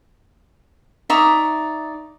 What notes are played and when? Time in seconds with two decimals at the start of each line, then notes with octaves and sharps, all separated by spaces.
1.10 D#4 D5 E5 C#6